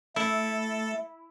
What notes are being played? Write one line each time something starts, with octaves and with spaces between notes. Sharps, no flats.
A3 E4 A4